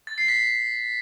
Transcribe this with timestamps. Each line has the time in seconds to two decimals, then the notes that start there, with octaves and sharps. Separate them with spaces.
0.07 A6
0.18 C7
0.28 B6